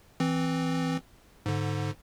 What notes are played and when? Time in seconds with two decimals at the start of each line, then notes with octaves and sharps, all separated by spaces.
0.20 E3 C4
1.46 G#2 D3